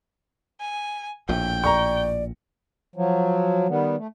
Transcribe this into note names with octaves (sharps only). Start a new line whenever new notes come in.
G#5
A#1 A2 G5
D5 A#5 C#6
F3 F#3
D#3 G3 B3
A3